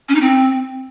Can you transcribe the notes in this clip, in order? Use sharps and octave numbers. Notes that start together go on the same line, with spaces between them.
C#4
D#4
C4